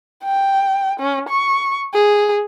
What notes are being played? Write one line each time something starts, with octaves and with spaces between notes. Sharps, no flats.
G5
C#4
C#6
G#4